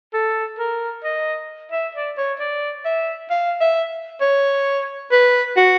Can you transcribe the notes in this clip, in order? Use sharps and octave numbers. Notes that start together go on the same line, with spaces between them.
A4
A#4
D#5
E5
D5
C#5
D5
E5
F5
E5
C#5
B4
F#4